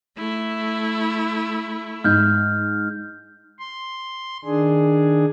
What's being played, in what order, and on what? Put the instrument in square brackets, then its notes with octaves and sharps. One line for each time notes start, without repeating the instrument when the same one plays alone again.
[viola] A3 E4
[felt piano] G#2 [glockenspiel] F6 G6
[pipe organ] C6
D#3 D4 G#4